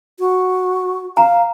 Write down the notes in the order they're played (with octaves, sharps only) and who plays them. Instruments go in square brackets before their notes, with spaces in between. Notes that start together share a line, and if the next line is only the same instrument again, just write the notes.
[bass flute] F#4
[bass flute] F5 [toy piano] A#5